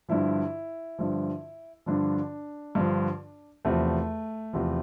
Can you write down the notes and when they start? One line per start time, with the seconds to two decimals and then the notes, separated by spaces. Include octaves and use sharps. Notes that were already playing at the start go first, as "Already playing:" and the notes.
0.09 G2 D3 F3 E4
0.99 G2 D3 F3
1.86 G2 D3 F3 D4
2.75 G2 D3 F3
3.65 E2 C3 F3 A3
4.53 E2 C3 F3